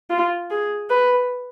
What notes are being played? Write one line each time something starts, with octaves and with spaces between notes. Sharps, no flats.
F4
G#4
B4